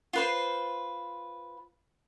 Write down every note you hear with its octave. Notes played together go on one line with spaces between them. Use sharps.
F4 B4 C5